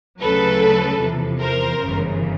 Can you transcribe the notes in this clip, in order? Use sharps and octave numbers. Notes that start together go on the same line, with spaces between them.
D2 C#3 F#3 A4 B4
E2 C3 F3
A#4 C5
G1 F#2 C#3 E3